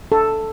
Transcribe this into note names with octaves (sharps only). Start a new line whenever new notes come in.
A4